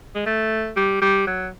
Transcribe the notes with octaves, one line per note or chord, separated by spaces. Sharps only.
G#3
A3
G3
G3
F#3